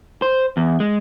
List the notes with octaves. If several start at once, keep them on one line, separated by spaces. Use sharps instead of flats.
C5
E2
G#3